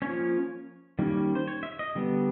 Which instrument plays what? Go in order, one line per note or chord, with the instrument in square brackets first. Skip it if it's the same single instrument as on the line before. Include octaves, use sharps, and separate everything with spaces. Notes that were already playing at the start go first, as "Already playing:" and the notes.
[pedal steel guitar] F3 A#3 C#4 C#5
D#3 G3 A#3 C#4
C5
C#5
E5
D#5
D3 G3 B3